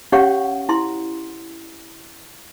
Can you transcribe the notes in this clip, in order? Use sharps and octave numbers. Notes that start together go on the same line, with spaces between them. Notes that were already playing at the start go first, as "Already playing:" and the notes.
C#4 G4 C#5 F5 F#5 C#6
E4 C6